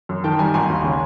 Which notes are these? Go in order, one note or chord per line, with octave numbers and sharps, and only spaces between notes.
F#2
D#3 G5 A5
G3 G#5 A#5
G#1 G#5 A#5
D#2
C#3